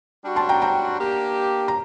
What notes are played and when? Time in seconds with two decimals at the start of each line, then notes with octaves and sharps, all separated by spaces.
0.24 G3 D4 F#4
0.36 A5 C6
0.49 G5 A#5
0.62 G5 A#5
1.00 A#3 D4 G4
1.68 A#5